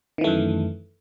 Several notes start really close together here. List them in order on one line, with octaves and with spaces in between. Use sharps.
D#3 E3 A3 F#2